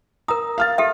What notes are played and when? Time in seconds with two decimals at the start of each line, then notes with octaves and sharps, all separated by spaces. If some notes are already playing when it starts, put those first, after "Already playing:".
0.28 A#4 A#5 D#6
0.58 F5 F6 A6
0.78 G4 A4 E5